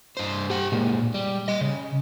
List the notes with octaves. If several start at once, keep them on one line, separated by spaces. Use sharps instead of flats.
G2 C5
G4 F#5
A#2 G#3
G3
D#5 C6
C#3